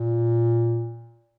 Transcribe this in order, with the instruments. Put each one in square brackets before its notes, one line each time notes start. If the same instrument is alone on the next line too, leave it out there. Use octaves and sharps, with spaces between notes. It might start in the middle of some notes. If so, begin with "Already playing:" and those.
Already playing: [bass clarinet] A#2